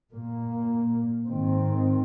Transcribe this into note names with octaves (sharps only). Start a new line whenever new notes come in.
A#2 A#3
G#2 D#3 C4